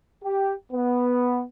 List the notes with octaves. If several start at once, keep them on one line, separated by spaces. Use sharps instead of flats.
G4
B3